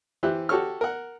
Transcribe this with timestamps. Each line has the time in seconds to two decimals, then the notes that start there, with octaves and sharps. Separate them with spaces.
0.23 E3 G4 C5 E5 F#6
0.49 F#4 G4 A4 C#5 C#6 F6
0.81 A#4 F#5